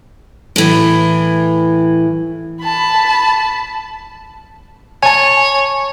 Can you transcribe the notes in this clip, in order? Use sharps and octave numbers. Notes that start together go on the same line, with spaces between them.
A2 E3
A5 B5
C#5 G#5 A5